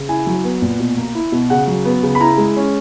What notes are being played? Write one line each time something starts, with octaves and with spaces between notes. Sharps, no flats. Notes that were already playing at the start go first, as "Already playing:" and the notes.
Already playing: C#3
E4 G#5
F#3
B3
A#2
B2
A#3
E4
B2
C#3 F#5
F#3
B3
C#3
B5
E4 A#5
G#3
C#4